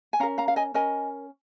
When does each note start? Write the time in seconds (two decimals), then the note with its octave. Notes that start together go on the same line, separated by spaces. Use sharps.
0.13 G#5
0.20 C#4 A#4 F5 A#5
0.38 F5 A#5
0.48 F5
0.56 D#5 G#5
0.74 C#4 A#4 D#5 G#5